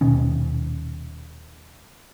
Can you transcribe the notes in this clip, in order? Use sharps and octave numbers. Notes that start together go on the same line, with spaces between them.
D#1 B2 D#3 C#4